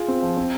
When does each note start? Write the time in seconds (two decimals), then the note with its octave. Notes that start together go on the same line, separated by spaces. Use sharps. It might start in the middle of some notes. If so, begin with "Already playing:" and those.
Already playing: F4 G#4
0.08 C4
0.22 F3
0.37 C4